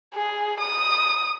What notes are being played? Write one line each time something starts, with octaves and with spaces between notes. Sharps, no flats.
G#4
D#6